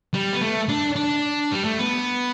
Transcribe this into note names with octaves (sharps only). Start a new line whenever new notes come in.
G3
B3
A3
D4
D4
G3
A3
B3